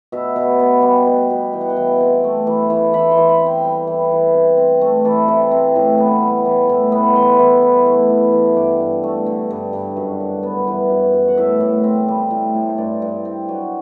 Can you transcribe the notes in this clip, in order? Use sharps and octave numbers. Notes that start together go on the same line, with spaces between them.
B2 E5
B2
B3
G3
B2
B2
E3 G5
F#5
G5
E3
C4
A3
E3
E3
E3 B5
C6
E3
B5
C4
G5
G3
E3
E3
C3
C4
A3
E3 A5
C3
C4
A2
B3
G3
E3
A2
B3
E3 C6
E3
E4
A3
E3
E3
G2 D6
G2
A3
D3
G2
G2
F#2
F#2
B3
E3
F#2
F#2
F#5
A2 E5
A2
C4
G3
A2
A2
C5
G2 D5
G2
C4
F#3